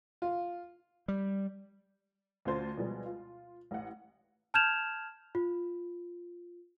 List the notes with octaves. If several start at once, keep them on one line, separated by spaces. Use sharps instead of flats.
F4
G3
D2 C#4 F4 C5 A5 A6
B2 F3 G3 G#3
F4
A1 F#5
A5 F6 G6 G#6 E7 F7
F4